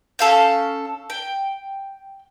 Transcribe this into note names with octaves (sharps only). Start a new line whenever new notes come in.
C#4 A4 F5 G6
G5